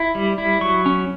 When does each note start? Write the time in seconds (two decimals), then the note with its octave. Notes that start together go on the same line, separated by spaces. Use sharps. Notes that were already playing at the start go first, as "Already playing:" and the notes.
Already playing: E4
0.15 G3
0.38 E4
0.61 F#3 C#6
0.86 C#4